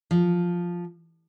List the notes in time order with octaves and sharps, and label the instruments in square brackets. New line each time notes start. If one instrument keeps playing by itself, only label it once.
[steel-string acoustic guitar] F3